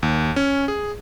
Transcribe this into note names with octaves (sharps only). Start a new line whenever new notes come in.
D#2
C#4
G#4